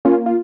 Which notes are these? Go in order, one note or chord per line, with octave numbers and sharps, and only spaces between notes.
A#3 C#4 F4
F4